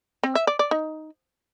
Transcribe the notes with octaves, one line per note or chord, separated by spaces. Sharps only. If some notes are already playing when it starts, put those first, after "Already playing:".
C4
E5
D5
D5
D#4